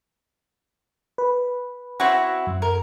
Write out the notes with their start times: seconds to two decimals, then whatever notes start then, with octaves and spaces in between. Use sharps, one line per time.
1.18 B4
2.00 C4 E4 F#4
2.47 F#2
2.62 A#4